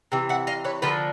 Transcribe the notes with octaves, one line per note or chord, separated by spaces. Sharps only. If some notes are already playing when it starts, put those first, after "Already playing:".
C3 E3
E5 F#5
D#5 F5
B4 C#5
D3 F3 A#3 A4 B4